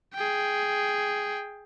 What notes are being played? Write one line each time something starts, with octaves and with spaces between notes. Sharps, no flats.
G#4 G5